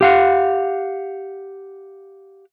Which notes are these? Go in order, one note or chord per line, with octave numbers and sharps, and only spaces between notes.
G4 F5 F#5